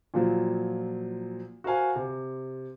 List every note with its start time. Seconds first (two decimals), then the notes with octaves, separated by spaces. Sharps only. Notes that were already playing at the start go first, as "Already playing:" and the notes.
0.14 A#2 F3 F#3
1.64 F#4 A#4 C5 F5 G#5
1.96 C3